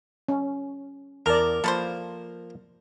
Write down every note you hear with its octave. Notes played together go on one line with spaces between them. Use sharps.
C#4
E2 A#4 D5 A5 A#5
F3 A#3 A4 B4 C5 F5